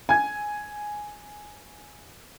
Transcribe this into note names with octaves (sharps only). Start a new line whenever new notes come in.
G#5 G#6